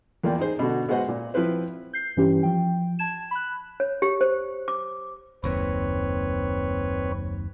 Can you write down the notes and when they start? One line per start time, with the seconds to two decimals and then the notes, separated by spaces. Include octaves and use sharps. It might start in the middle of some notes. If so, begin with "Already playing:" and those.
0.24 E2 A#3 F4 D5 G5
0.39 D#4 G#4 C5
0.59 B2 D3 F#4
0.89 G#3 B3 F#4 C5 D#5 F#5
1.08 A#2
1.34 F3 C4 E4 B4 C5
1.93 G6 C7
2.17 G2 E3 C#4 G4
2.43 F3 G5
2.99 A5 G#6 E7
3.31 B5 F#6
3.80 C#5
4.02 G4
4.21 C5
4.68 D6
5.44 F#1 D#2 C4 B4 C#5